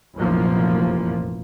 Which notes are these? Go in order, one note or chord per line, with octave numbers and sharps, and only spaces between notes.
F1 A#1 F#2 E3 F3 A#3